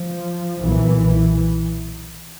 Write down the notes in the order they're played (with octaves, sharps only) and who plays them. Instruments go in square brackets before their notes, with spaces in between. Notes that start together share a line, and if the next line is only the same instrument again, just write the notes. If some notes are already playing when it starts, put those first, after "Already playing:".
Already playing: [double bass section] F3
B1 A#2 E3